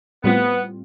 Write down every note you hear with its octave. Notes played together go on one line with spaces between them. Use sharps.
A2 G3 B3 C4 F4